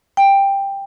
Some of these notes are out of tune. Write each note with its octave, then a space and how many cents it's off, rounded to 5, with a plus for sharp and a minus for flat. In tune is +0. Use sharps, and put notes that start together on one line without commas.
G5 +10